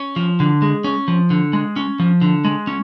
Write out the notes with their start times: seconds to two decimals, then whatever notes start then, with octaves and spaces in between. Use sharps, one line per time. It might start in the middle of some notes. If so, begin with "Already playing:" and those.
Already playing: C#4
0.16 F3
0.40 D3
0.62 G#3
0.84 C#4
1.08 F3
1.30 D3
1.53 G#3
1.76 C#4
1.99 F3
2.21 D3
2.45 G#3
2.67 C#4